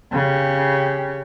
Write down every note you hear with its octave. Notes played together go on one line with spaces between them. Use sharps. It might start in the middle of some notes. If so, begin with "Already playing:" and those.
C#3 G4